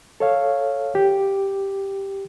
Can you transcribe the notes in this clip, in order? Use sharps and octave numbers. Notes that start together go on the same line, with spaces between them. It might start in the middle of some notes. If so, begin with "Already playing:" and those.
A4 C#5 F5
G4